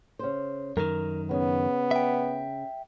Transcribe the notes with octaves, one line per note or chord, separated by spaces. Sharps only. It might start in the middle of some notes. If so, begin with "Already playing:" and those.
C#3 C5
F#2 D#3 A#4
C#3 B3
E5 G5